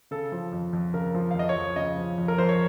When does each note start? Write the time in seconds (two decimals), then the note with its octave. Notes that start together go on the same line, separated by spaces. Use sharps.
0.11 C#3 A4
0.32 F3
0.53 F2
0.73 F2
0.93 C#3 A#4
1.15 F3
1.31 F5
1.35 F2 D#5
1.49 C#5
1.56 F2
1.76 C#3 D#5
1.97 F3
2.18 F2
2.28 A#4
2.38 F2 C5
2.49 C#5